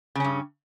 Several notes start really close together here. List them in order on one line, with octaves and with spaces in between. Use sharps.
C#3 C#4 G2